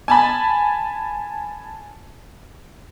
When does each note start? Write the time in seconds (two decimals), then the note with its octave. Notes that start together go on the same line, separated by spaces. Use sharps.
0.08 G#5 A5 B5